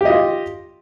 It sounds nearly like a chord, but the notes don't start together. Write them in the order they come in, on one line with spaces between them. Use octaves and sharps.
G4 D#5 F4